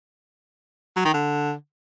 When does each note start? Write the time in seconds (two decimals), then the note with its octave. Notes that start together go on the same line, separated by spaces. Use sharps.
0.96 F#3
1.05 D#3
1.14 D3